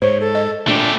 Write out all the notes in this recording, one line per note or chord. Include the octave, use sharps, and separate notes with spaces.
G#2 C5 C#5
A4
D#5
A#2 A3 D4 G4